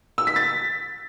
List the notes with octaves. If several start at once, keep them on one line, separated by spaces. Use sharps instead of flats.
E6
B6
A6